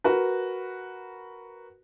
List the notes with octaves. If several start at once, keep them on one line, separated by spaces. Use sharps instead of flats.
F#4 A#4 B4